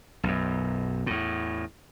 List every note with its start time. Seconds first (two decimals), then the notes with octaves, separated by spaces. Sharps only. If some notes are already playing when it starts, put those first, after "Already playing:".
0.23 B1 F#2
1.06 E2 A2